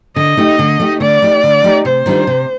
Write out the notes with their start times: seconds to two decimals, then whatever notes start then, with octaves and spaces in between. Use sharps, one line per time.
0.16 D3 D#5
0.37 A3 D#4 G4
0.59 D3
0.80 A3 D#4 G4
1.00 D3 D5
1.22 A3 D#4 G4
1.44 D3
1.64 A3 D#4 G4
1.85 C3 C5
2.06 D#3 G3 D4 F4
2.27 C3